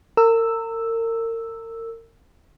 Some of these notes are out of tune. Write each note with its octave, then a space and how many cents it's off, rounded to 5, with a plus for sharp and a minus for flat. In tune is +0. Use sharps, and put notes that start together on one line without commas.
A#4 -35 E6 +0